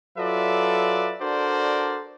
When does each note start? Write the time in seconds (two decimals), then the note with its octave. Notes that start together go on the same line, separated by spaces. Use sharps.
0.18 F#3 F4 A4 B4 D5 E5
1.21 D4 F#4 A4 A#4 C5 D5